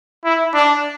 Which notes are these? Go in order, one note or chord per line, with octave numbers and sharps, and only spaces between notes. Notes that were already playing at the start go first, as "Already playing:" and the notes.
E4
D4